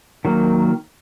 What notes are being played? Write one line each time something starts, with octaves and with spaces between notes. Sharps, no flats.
D#3 F#3 A#3